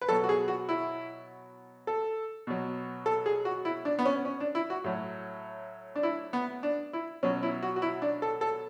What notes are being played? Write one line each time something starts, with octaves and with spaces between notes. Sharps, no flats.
B4
B2 F#3 A4
F#4
G#4
F#4
E4
A4
B2 F#3
A4
G#4
F#4
E4
D4
B3
C#4
C#4
D4
E4
F#4
A2 F#3
D4
E4
B3
D4
E4
B2 F#3 C#4
E4
F#4
F#4
E4
D4
A4
A4